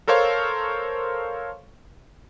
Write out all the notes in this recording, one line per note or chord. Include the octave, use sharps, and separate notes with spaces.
A4 A#4 C5 C#5 F5 C#6